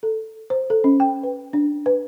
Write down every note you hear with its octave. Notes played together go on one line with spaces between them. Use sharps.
A4
C5
A4
C#4
G5
B4
D4
B4